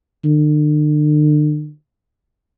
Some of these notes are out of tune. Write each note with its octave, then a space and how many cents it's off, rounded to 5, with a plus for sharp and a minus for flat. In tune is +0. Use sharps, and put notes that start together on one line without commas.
D3 +40